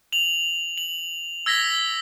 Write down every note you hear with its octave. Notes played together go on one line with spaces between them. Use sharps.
F7 F#7
F#7
E6 G#6 A#6 B6 G7